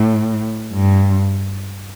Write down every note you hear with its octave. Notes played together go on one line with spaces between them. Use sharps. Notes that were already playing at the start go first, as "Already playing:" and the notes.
Already playing: A2
G2